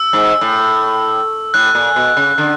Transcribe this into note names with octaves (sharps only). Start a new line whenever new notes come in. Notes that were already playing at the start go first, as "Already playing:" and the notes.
Already playing: E6
G#2
A2
A2 F#6
A#2
B2
C#3
D3